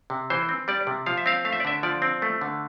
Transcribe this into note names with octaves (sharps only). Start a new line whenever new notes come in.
C3
E3 C5
C4
G3 D5
C3
F3 F5
E5
C4 F5
A3 F5
E5
D5
D3 E5
F3 D5
C4
A3
D3